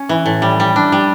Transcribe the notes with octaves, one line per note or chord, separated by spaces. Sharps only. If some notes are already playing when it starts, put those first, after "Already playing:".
Already playing: C#4
E3
A2
G3
G3
D4
G3